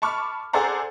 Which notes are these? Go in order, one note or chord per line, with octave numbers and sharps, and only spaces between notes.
A5 B5 C#6 D6 F6
G#4 A4 C5 D5 F#5 A#5